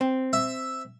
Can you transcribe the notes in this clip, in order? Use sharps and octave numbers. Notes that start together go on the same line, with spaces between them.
C4
E5